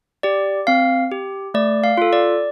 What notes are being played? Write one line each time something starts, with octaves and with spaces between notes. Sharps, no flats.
G4 D5
C4 F5
G4
A3 D5
F5
F4 A4
D5